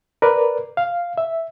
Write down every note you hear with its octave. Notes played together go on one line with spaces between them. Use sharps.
A#4 B4 D5
F5
E5